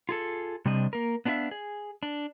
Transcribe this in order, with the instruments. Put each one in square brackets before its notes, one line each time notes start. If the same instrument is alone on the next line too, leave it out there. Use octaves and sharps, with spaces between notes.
[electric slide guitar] F4 G#4 A4
C3 G3 C4 D4 D#5
A#3 A#4
B3 D4 D#4 F4 E5 F5
G#4
D4